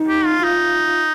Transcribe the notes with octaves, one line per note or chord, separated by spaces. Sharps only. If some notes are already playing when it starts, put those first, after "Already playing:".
Already playing: D#4
G4
F4
D#4 F4